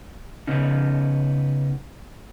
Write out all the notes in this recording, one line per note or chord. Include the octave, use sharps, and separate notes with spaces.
C#3 B3 C#4 D#4